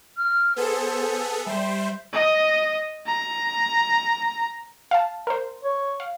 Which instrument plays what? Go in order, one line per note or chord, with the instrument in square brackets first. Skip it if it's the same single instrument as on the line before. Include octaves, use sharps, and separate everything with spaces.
[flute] F6
[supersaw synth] B3 G#4 A4 [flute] C5
[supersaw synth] G3 C5 [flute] E5
[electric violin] D#5
A#5
[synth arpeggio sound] F5 A5
A#4 C5
[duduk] C#5
[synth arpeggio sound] F5